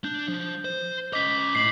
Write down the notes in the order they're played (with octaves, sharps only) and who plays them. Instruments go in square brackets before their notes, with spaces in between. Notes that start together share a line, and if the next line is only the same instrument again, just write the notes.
[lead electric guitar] D4 [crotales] G6
[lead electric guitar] F3
C5
[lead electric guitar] C#4 D#5 [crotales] D6 B6
[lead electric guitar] A2 [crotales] C7 F#7